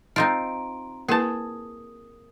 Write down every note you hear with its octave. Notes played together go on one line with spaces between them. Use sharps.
C4 D#4 F4 A#5 C6 D7
A#3 E4 G#4 A#4 B4 A5 D#6